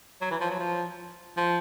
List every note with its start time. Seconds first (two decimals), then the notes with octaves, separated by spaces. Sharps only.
0.21 F#3
0.31 E3
0.41 F3
0.50 F#3
0.59 F3
1.37 F3